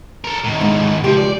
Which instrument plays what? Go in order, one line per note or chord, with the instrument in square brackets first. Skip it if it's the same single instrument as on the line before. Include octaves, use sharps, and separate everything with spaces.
[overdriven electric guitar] A4 A#4
A2 D#3
[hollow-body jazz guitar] G#2
[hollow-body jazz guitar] C#2 G4 [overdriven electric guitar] F3
[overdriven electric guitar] D5